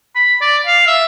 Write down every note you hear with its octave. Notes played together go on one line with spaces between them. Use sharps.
B5
D5
F5
E5